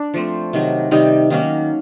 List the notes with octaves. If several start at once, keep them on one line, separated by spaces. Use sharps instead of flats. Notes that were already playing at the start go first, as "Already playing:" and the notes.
Already playing: D4
F3 A3 C4
C3 D#3 F#3
C3 D#3 G3 D#4
D#3 F#3 A#3 C#4